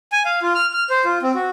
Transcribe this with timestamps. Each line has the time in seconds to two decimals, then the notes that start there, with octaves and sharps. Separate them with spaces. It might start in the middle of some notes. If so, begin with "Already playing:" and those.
0.12 G#5
0.25 F5
0.42 F4
0.55 F6
0.73 F6
0.90 C5
1.05 F4
1.22 C4
1.35 F#4